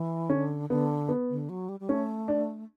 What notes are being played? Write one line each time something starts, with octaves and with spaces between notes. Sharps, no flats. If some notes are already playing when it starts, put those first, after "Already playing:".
Already playing: E3
D3 C#4
D3 B3
B3
D3
F#3
G3
G3
A3 C#4
D4